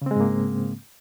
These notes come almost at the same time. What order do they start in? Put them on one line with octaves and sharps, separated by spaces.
C#3 C4 G#3 G#2 A#3